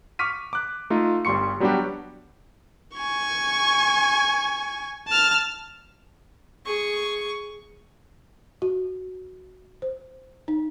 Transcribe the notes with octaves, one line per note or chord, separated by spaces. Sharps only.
C#6 D6 F6 B6 D#7
D6 F#6
A3 D#4 F4
G1 G3 C6 C#6 C#7
F#3 G3 B3 D4 F#4 G4
G#5 C#6
A5 F6
G#4 C#6
F#4
C5
D#4